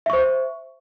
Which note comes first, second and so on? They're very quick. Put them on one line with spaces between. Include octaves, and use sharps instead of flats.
E5 C#6 C5